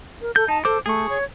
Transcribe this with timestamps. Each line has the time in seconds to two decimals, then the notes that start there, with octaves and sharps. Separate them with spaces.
0.21 A#4
0.36 A4 G6
0.48 D#4 A5
0.65 A4 C5 D6
0.86 A3 G#4 C#6
1.09 C#5